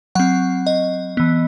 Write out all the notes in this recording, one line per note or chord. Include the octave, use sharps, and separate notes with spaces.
F#3 C4 F#5
D#5
E3 B3